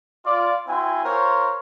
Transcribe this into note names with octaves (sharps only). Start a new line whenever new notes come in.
F4 D5
C4 E4 F#4 G#5 C6
F4 A#4 C5 C#5